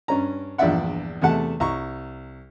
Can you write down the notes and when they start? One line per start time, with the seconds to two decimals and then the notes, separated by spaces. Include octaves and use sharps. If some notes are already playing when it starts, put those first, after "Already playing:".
0.08 G2 C#4 A#5
0.58 A#1 E2 G2 D5 E5 F#5
1.22 E2 C3 A3 F#5 A5
1.60 C2 A#5 C#6